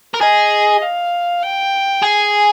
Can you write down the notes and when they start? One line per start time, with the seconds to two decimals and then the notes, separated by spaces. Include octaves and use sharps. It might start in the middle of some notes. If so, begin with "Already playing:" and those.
0.14 A#4
0.20 G#4 D#5
0.82 F5
1.43 G5
2.03 G#4 G#5